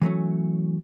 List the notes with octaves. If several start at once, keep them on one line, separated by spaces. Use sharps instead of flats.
E3 F#3 A3 C#4